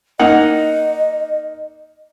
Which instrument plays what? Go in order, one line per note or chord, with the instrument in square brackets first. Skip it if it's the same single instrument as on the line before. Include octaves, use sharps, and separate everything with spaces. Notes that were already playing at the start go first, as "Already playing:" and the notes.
[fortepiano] A#3 D#4 F#5 [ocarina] D#5